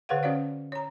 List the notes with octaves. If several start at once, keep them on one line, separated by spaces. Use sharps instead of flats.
D3 G#4 B4 C#5 F5 F#5
C#4 F#4 C#5 D5 F5
C#5 A#5